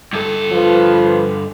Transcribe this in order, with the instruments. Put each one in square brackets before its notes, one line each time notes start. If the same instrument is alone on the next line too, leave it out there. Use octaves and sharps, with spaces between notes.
[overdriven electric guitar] G2 A4
[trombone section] F3 F4 B4